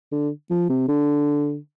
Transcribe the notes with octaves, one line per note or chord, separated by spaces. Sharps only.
D3
F3
C3
D3